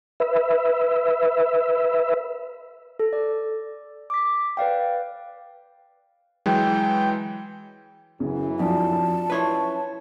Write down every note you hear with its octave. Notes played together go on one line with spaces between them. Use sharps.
B4 E5
A4
D5
D6 B6
B4 D5 F5 G5
E3 F#3 G#3 G5
F#2 C#3 E3
F2 F#3 D4 F4 A5
C#4 E4 B4 C#5